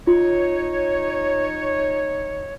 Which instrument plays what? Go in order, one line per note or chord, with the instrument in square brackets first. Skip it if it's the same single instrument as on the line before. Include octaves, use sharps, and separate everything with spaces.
[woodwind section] D#4 C#5 [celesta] F4